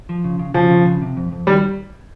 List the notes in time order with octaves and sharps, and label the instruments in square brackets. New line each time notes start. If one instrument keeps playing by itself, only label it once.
[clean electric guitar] F3
C#3
C#3
[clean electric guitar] C#3 [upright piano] F3
[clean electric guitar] C#3
C#3
C3
F2
F2
[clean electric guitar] D#3 [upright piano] G3